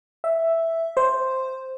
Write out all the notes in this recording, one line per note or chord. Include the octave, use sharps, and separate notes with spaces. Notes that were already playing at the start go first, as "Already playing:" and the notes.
E5
C5